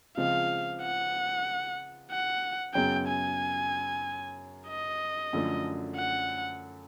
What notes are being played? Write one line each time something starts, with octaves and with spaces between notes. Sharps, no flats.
C#2 C#3 F3 G#3 C4 F5
F#5
F#5
F#2 C#3 F#3 B3 G5
G#5
D#5
F#2 D3 F3 A3
F#5